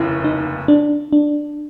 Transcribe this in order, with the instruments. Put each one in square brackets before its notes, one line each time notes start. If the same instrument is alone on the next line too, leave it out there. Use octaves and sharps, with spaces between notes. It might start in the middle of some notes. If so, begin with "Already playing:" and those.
Already playing: [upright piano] F1 D#2 C#3 [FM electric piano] E4
[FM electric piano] D#4
D4
D4